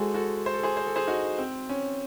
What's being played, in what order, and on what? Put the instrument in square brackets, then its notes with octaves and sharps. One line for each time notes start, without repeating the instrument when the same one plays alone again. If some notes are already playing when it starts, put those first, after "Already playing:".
Already playing: [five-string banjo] G#3 [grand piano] F#4 G#4 A4 C5
[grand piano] F#4 A4
C5
A4
G#4 C5
C5
A4
G#4 C5
D#4 F#4
C4
C#4